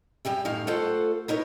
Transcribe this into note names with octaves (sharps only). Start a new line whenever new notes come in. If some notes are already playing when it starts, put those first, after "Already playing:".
F#2 G3 G4 E5
F#2 A2 D#3 F5
A3 F4 A4 C5 F5 F#5
B3 D#4 A#4 C#5